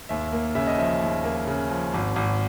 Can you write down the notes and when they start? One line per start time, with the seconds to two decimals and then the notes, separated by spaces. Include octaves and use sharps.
0.09 D#2 E5
0.33 A#3
0.55 C#3 E5
0.67 D#5
0.78 F3 E5
1.02 D#2
1.24 A#3
1.47 C#3
1.71 F3
1.94 G#1
2.16 G#1